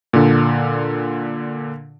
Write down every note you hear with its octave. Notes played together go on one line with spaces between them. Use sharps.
A#2 D3